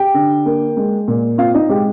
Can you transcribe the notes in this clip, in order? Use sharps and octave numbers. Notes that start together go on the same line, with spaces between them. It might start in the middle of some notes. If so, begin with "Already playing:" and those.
Already playing: G4 G5
D3
A#3
G#3
A#2
C4 F4 F5
D#4 D#5
G#3 G4